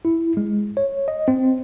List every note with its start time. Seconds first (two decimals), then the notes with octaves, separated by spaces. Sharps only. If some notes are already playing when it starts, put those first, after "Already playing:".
0.05 E4
0.37 G#3
0.77 C#5
1.08 D#5
1.28 C4